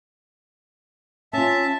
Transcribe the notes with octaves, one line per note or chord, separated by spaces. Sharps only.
C#4 F4 E5 A5